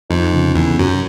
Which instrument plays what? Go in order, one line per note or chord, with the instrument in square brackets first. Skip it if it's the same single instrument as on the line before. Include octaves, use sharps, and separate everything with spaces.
[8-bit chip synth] F2 [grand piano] D#4
[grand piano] C#3
[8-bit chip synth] E2 [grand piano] C#3
[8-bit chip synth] F#2 [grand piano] F#3